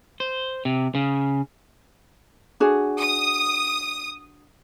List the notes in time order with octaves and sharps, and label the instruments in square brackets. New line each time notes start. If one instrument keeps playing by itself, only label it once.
[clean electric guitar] C5
C3
C#3
[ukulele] D4 F#4 G#4
[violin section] D#6